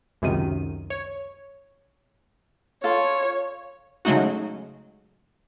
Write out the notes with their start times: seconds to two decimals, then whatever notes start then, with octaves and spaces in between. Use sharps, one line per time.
0.22 C#2 F#2 C3 D#3 D#7
0.90 C#5
2.84 F4 A4 C#5
4.05 C#3 F#3 G#3 A3 D#4 F#4